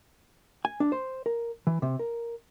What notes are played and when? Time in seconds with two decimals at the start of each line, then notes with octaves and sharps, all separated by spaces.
0.65 G#5
0.80 D4
0.92 C5
1.26 A#4
1.67 E3
1.82 C3
1.99 A#4